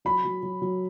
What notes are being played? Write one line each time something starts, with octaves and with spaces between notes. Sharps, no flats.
F#3 B5
F#3
F#3
F#3